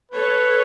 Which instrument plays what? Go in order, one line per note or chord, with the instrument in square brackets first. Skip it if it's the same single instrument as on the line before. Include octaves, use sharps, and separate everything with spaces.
[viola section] A4 C#5 [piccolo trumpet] B4